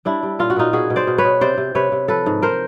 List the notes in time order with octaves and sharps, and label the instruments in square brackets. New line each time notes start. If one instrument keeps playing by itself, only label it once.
[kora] G3 D4 E4
G3
A#2 F4
F#4
A#2 D#4 F4
B2 F#4 G#4
B2
C5 D5
B2
B4 C#5
B2
C3 C5 D5
C3
C3 B4 C#5
C3
F3 A4 B4
G#2
A#4 C5